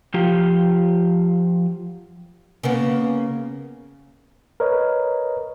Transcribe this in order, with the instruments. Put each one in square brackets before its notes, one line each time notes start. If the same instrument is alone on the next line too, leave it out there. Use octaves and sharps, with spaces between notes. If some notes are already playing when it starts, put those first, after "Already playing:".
[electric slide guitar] F3 F4 G4
[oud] C#3 A#3 B3
[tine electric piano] A#4 B4 C#5 D#5